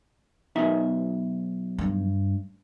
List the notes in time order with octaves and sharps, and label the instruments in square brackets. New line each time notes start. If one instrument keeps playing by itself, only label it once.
[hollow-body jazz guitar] B1 D#4 E5
[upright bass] G2